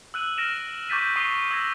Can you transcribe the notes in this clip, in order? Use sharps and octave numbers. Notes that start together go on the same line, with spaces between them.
E6 F#6 D#7 F#7
F6 F#6 A#6 D7 E7
C#6 D6 G6 A6 B6 D#7
C#6 D#6 C7 G7
E6 G#6 A#6